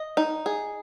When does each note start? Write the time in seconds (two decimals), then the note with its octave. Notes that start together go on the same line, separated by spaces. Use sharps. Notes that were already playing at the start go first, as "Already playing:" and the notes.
Already playing: D#5
0.17 D#4
0.46 G#4